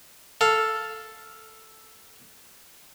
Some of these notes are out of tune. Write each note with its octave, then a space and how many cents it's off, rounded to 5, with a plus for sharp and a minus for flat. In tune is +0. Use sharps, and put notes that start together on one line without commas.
A4 +0 F5 +0